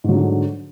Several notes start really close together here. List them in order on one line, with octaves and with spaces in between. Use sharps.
G#2 F#3 D3 D4